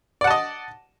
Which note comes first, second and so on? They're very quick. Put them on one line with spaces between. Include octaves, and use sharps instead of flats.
D5 F#5 A5 D#5